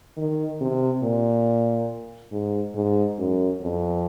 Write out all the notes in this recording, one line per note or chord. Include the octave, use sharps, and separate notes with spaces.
D#3
C3
A#2
G#2
G#2
F#2
F2